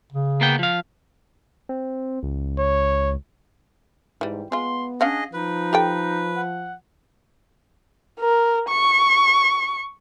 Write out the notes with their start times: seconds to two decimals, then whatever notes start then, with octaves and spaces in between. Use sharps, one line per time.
0.12 C#3
0.41 A#3 B3 G5
0.59 F3 F5
1.69 C4
2.23 C#2
2.58 C#5
4.21 G#2 E3 G3
4.52 G#3 B3 F4 C6
5.01 C#4 D4 G#4 D#5 F5 F#5
5.33 F3 D#4 B4
5.73 G4 A4 G5
6.36 F#5
8.20 A#4
8.69 C#6